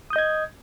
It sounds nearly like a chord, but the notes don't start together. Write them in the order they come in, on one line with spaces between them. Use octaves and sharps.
D#6 G6 D#5 G#6